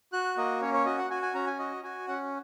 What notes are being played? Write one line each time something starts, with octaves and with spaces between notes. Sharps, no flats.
F#4 F#6
A#3 D#5
C#4 C#5
C#5
F#4 D#5
F#5
F#4 G#5
G#5
C#4 A#5
G#5
F#4 D#5
F#4 G#5
C#4 F#5